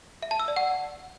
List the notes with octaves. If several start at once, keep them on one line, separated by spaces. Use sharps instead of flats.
E5
A5
E6
D5
F#5